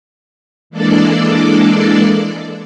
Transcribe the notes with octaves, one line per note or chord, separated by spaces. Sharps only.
E3 G#3 A#3 D4 A4 D5